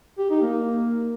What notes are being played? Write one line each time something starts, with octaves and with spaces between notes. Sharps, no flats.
G4
D#4
A#3